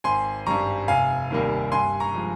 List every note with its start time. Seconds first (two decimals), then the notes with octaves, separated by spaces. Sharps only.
0.04 G#1 G#5 C6
0.46 G2 G3 A#5 C#6
0.88 F1 F5 G#5
1.30 D#2 D#3 G3 A#3
1.72 G2 G#5 C6
2.00 A#5 C#6
2.14 F3 G#3